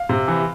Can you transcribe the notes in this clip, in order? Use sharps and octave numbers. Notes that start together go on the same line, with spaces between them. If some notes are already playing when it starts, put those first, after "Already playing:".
Already playing: F5
C3
E3